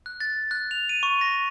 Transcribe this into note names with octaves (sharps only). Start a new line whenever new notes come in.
F#6
A6
F#6
F7
D#7
C#6
A#6